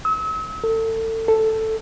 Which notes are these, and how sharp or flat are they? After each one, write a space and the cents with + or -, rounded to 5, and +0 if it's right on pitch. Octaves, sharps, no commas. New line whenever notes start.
E6 -40
A4 +30
A4 +5